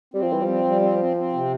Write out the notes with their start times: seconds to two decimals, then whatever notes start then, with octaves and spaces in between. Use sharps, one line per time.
0.14 G3 C4
0.22 F3
0.30 E3 G3
0.42 F3
0.48 C4
0.65 G3
0.82 C4
0.99 C4
1.17 C4
1.34 C3